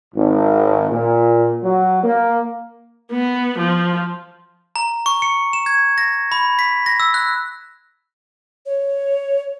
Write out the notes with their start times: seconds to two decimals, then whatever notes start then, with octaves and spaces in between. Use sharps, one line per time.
0.15 G#1
0.90 A#2
1.63 F#3
2.03 A#3
3.12 B3
3.58 F3
4.76 A#5
5.06 C#6
5.22 C#7
5.53 E7
5.66 G#6
5.98 A#6
6.32 B5
6.59 B6
6.86 A#6
7.00 E6
7.14 F#6
8.66 C#5